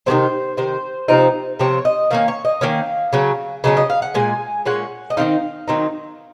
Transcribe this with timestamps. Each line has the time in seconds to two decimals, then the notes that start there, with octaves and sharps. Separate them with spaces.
0.06 C3 D#3 F#3 C4 C5
0.57 C3 D#3 C5
1.08 C3 F3 C4 D#4
1.60 C3 F3 C4 C#5
1.85 D#5
2.11 D#3 A#3 C#4 F5
2.28 C#5
2.45 D#5
2.61 D#3 A#3 C#4 F5
3.13 C#3 F#3 C#4
3.64 C#3 F#3 C#4 D#5
3.77 D#5
3.90 F5
4.02 F#5
4.14 A#2 G#3 G#5
4.65 A#2 G#3 C#4 F#5
5.10 D#5
5.17 D#3 F#3 C4 D#4 F5
5.68 D#3 F#3 C4 D#4